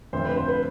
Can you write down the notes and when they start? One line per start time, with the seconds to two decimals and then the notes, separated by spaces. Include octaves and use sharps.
0.12 F2 D3 A3 C5
0.24 B4
0.37 C5
0.48 B4